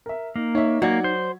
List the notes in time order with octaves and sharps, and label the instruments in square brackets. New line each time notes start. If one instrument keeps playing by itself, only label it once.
[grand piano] A#4 E5
[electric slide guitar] A#3 [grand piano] D#4
[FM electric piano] D#4 [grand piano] C#5 E5
[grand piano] F#3 D5 G#6 [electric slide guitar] A#3 [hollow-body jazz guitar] F#4
[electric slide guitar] C5